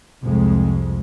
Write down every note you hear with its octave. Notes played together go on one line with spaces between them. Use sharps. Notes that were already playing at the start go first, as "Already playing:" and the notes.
C2 F2 G#3